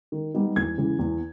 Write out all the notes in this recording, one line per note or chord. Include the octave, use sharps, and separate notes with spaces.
D#3
G3 B3 D#4
E2 G#6
C#3 E3
E2